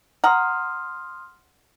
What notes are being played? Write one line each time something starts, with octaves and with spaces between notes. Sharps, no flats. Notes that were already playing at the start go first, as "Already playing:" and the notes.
F#5 A#5 C6 D#6 F6